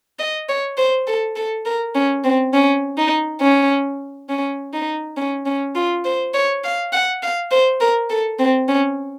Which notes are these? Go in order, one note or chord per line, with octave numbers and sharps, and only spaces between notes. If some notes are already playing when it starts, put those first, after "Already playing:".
D#5
C#5
C5
A4
A4
A#4
C#4
C4
C#4
D#4
C#4
C#4
D#4
C#4
C#4
F4
C5
C#5
F5
F#5
F5
C5
A#4
A4
C4
C#4